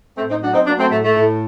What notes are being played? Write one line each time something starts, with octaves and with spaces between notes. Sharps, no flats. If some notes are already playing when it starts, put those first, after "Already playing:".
A2 A3 C4
C4 D#4
F#3 D4 F#4
C4 D#4
F#3 A#3 D4
A3 C4
A2 A3
A3
A2